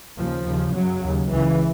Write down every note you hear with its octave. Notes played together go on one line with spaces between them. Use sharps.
D#2 C#3 F3
D#2 C#3
F#2 C#3 F#3
D#2 C#3
C#2 C#3 E3